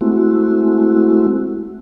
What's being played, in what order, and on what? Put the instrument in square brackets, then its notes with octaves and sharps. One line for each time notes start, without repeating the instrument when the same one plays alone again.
[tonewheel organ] G#3 A3 C4 E4 F#4